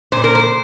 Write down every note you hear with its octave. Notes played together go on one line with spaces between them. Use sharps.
A#2 C5
A#4
C5